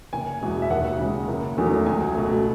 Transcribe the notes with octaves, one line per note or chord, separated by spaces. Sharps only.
F#1 G#5
E2 B2 G#3
E5
D#2 F#5
C#3 G#3
F#1
E2 D#3 F#3 A3
C#2 G#5
B2 A3